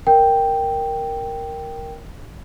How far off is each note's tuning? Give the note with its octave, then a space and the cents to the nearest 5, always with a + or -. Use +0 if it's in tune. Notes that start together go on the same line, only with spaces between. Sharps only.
A#4 +0 G5 +0